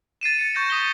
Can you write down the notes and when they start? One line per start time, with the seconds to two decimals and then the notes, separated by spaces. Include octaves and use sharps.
0.21 A6 C7 D#7 E7
0.39 A6 C#7
0.54 C#6 G6 A6 A#6 C#7
0.70 D#6 B6 G7